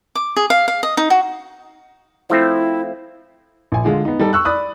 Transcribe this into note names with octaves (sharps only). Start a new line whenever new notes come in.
D6
G#4
F5
F5
D#5
D#4
F#4
F3 A3 C4 E4
A#1 G#5
D3 G#3 F4 G#4
B3 D#4
G3 D#4 A4
C#6 E6 F#6
D5 B5 D#6 F#6